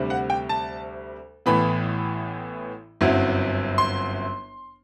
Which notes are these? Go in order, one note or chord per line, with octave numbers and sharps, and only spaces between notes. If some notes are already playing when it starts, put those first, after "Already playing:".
Already playing: D2 C3 G3
F#5
G5
A5
A1 A2 E3 B3 B5
G1 F#2 F#3 C4 E4
C6